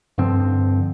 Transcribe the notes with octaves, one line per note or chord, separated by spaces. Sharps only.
G2 D3 F3 C4